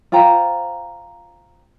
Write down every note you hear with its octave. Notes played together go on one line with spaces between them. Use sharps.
F4 C5 G5 A#5